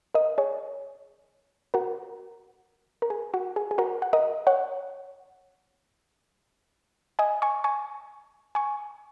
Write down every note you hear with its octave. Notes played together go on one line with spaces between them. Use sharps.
A#4 D#5
G#4 C#5
F#4 A#4
A#4
G#4
F#4
G#4
G#4
F#4 A#4
F#5
A#4 D#5
C#5 F#5
D#5 G#5
G#5 C#6
G#5 C#6
G#5 C#6